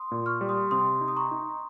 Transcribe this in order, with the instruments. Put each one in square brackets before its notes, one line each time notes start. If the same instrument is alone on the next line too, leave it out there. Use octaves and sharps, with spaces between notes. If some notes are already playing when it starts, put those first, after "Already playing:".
Already playing: [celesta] C6 D#6
[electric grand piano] A#2
[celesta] C#6 F6
[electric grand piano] G3
[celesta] C6 D#6
[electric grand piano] C3 [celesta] C6 D#6
[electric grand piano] D#4
[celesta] D#6
A#5 C#6
[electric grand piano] D#4